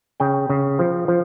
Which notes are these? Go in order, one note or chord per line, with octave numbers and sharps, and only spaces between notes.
C#3 G5
C#3
F3
F3